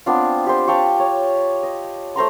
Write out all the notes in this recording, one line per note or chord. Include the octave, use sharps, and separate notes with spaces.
B3 C4 D4 F4
G4 C5
F5 G5 A5 C#6
C#5
D#5
A3 C5 A#5 C6